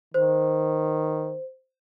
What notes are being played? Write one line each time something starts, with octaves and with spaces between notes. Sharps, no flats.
D#3 C5